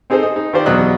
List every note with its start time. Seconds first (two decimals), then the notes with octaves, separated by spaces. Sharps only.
0.10 C4 D#4 G#4 A4 C5
0.23 D#5
0.36 D#4
0.53 D#3 F4 G4 C5 D5
0.66 E2 B2 F#3 D4 D#5 F#6